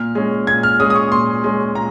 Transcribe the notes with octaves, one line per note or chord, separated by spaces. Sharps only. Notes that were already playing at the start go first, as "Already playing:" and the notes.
Already playing: A#2 F6
G#3 C#4
A#2 G#6
F6
G#3 C#4 D#6
D#6
C#6
A#2 C6
G#3 C#4
A#2 A#5